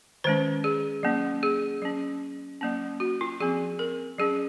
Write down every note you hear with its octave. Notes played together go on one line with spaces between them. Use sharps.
D#3 G#3 C#4 C5
G#4
F#3 A#3 C#4
G#4
F#3 C#4
F#3 A#3 C#4
F#4
F4
F3 C4 G#4
A#4
F#3 C#4 G#4